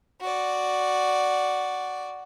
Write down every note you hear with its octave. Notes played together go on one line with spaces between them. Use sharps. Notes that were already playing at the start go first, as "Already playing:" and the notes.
F#4 D5